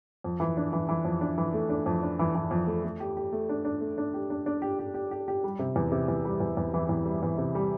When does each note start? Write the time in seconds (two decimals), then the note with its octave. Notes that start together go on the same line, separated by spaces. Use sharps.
0.24 F2
0.40 E3
0.57 D4
0.73 E3
0.89 E3
1.05 F2
1.21 D4
1.38 E3
1.54 A3
1.70 D4
1.86 F2
2.03 D4
2.19 E3
2.35 E3
2.51 F2
2.67 A3
2.83 A3
3.00 G4
3.17 G4
3.33 A3
3.49 D4
3.65 D4
3.81 A3
3.98 D4
4.14 G4
4.30 D4
4.46 D4
4.62 G4
4.79 G4
4.94 G4
5.11 G4
5.28 G4
5.44 G3
5.59 C3
5.76 E2
5.92 C3
6.08 E2
6.25 G3
6.40 E2
6.57 E2
6.74 E3
6.89 E2
7.05 G3
7.23 E2
7.38 C3
7.55 G3